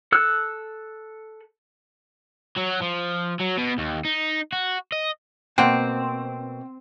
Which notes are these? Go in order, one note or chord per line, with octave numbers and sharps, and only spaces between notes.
A4 E6 F#6
F#3
F3
F#3
B2
D#2
D#4
F#4
D#5
B2 A#3 C4 F#5 G5